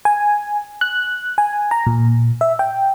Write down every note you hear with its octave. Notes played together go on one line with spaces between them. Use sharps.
G#5
F#6
G#5
A#5
A#2
E5
G5